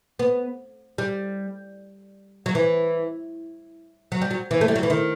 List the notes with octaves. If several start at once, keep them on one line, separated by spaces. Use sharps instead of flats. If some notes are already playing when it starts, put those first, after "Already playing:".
B3
G3
F#3
E3
F#3
G3
F#3
E3
A3
G3
F#3
E3
D#3